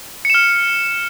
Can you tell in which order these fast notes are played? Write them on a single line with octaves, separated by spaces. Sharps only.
C#7 E7 F6